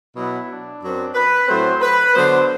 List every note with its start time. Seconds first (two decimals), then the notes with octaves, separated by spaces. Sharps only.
0.15 B2 F#3 B3 E4
0.49 D4
0.82 F#2 F#3 C4
1.14 B4
1.48 A2 F#3 A3 C4 C5
1.81 B4
2.14 D3 F#3 B3 C5